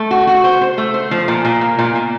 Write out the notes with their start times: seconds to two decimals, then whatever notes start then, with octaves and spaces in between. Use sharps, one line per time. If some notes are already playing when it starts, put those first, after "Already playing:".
Already playing: A3
0.11 F#4
0.27 F#4
0.44 C5
0.62 C5
0.78 A3
0.94 C5
1.11 F3
1.28 A#2
1.45 A#2
1.61 A#3
1.79 A#2
1.95 A#2